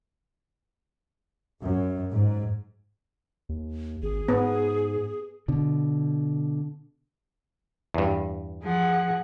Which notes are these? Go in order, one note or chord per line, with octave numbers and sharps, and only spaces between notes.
F#2
G#2
D#2
G#1 G#4
G#2 B3
B2 D3
E2 G2
F3 G#4 F#5